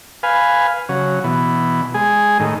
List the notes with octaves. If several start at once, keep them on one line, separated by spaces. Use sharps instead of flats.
B4 F5 G#5
C#3 F#3
B2 E3
G#3 G#4
A2 D#3